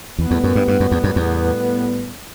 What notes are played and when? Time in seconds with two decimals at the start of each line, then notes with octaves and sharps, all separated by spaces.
0.19 E2 A2 G3 B3
0.31 E2
0.43 F#2
0.55 G2
0.68 G2
0.80 F#2
0.91 E2
1.04 F#2
1.16 E2